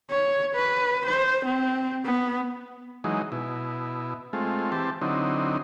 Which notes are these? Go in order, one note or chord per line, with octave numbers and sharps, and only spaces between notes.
C#5
B4
C5
C4
B3
E3 F#3 G#3 D#4
B2 E4
G#3 A3 C4 F4
E3 C4 G4 A5
D3 F#3 C4 D#4 E4